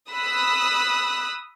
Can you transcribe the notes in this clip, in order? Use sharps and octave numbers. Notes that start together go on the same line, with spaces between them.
B5 D#6 E6 F#6